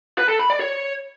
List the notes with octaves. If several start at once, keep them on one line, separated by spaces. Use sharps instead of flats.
B4
A4
B5
D5
C#5